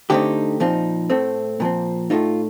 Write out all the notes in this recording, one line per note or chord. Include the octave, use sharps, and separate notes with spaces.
D3 A3 C4 D#4 G4
A#2 F3 C4 D#4
A2 A3 C4
A#2 F3 C4
A2 A3 D#4 F4